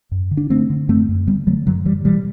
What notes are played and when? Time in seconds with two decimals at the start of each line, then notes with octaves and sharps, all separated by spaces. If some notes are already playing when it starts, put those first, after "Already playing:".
0.11 F#2
0.31 D3
0.37 D4
0.50 D3 A3 C4
0.70 D3
0.89 F#2 A3 C4
1.09 F#2
1.27 D3 G3 B3
1.47 D3 F#3 A3
1.66 F#2 D3 F#3
1.85 F#2 E3 G3
2.05 B2 E3 G3